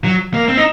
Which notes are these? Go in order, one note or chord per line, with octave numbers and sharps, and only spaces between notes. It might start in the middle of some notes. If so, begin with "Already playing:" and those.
F#3
A#3
C4
D#4